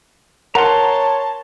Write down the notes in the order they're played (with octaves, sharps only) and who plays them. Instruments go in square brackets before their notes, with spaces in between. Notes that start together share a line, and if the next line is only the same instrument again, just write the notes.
[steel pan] A#4 F#5 [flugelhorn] C#5 [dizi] A5 [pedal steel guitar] A#5 C6